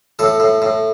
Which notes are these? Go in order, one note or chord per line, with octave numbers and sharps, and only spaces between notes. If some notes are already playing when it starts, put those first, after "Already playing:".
A2 A4
A2
A2